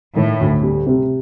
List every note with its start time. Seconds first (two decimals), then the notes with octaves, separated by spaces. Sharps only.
0.16 A2 D#3
0.40 D2
0.63 G3
0.86 C3